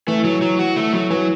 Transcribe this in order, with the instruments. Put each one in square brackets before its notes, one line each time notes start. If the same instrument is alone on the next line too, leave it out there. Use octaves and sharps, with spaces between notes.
[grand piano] E3 [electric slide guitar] A3
[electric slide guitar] F#3
F#3
F#4
A3
F#3
[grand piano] E3 [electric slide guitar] F#3